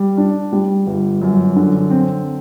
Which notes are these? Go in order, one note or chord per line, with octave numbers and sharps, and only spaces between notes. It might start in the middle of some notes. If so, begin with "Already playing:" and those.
Already playing: G3
D4
G3
G1
F#2
D3
C4